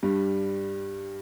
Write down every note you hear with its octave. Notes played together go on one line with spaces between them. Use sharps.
G2 G3